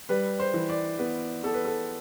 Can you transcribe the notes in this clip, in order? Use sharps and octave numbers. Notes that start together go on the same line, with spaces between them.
G3 B4
C5
E3
D5
B3 B4
B3 A4
B4
A4